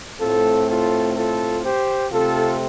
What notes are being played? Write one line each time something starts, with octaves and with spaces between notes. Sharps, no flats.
A2 A3 C4 F4 A4
F4 A4
F4 A4
G4 C5
C3 A3 C4 F4 A4